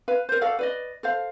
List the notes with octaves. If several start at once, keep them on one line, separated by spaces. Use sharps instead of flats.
B4 F5
A#4 C5
F#4 A4 D5 F5
B4 D5 D#5
A4 C5 F5